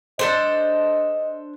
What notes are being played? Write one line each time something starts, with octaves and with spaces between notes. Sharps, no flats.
D4 A4 C5 D#5